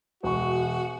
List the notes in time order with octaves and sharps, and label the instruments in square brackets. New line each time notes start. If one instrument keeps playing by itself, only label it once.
[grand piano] E1 C#6 [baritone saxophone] F#4